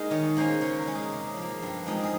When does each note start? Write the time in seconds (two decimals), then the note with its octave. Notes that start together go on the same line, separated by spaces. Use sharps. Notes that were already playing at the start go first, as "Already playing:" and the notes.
Already playing: G#3 A#3 D#4 A#4
0.11 D#3 C#5
0.37 A#3 C#4 C5
0.61 C#3 C#5
0.78 A#4
0.87 G#3 C#4
0.95 G#4
1.12 C3
1.36 F3
1.42 A#3
1.62 G2
1.86 F3 G#3 C4 D#4
2.03 G#4